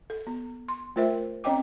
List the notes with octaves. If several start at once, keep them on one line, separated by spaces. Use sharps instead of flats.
A4
B3
C6
A3 F4 A#4 C5 E5
C4 C#4 C#5 D#5 G5 D6